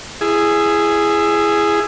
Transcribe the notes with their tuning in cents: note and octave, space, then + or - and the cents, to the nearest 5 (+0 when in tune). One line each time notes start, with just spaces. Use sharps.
E4 +20 G#4 +0